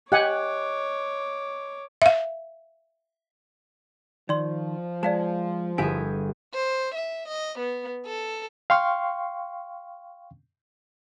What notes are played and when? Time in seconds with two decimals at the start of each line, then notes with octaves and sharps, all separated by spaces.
0.12 G4 C#5 D#5 F#5 G#5 D6 F#6
2.02 E5 F5
4.29 D#3 F3 D5 C6
5.03 G#3 D5 F5 A5
5.78 G1 E4 G4 G#4 E5 G#5
6.54 C5
6.95 E5
7.28 D#5
7.59 B3
8.06 A4
8.70 F5 G5 C6 C#6 F6